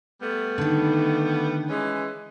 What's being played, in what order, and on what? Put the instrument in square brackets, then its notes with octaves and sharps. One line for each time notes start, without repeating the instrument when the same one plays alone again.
[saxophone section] G3 A3 B3
[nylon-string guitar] D3 D#3
[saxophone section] E3 G#3 C#4